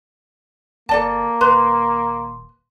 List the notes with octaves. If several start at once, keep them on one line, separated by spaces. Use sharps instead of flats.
G1 A#3 A4 D5 A5
D#1 B4 C6